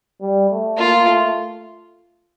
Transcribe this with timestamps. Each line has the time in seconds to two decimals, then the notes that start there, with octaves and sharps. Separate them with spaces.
0.21 G3
0.50 A3
0.78 A#3 F4
1.07 A3